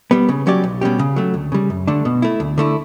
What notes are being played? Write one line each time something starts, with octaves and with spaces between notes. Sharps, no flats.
G3 B3
C#3
F#3 C#4 G4 D5
B1
B2 G3 C#4 G4
C#3
F#3 A3
D2
C#3 G3
F#2
D3 A3 D4
B2
A3 E4
D2
D3 A3 E4